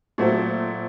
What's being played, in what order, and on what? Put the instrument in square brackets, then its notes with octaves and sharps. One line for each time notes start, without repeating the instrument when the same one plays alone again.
[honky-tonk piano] A#2 F#3 A3 C4